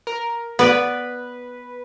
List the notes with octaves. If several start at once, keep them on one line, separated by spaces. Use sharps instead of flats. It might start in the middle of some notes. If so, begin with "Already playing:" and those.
A#4
B3 B4 D5